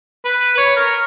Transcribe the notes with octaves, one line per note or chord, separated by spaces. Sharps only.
B4
C#5
A#4